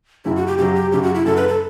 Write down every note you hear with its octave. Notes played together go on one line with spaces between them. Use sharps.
F#2 C#3 F#3 E4
F#4
G4
F#2 C#3 F#3 G4
G4
F#2 C#3 F#3 G4
F#4
E4
F#2 C#3 F#3 A4
B4
A4